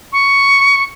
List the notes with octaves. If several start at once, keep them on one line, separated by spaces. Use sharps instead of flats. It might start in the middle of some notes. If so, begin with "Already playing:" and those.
C#6